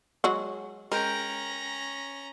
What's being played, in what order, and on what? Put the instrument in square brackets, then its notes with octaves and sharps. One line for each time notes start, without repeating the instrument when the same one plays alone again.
[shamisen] F#3 G#3 F#4
[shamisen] G#3 [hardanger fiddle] C#4 A#5 [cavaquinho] A#4 G5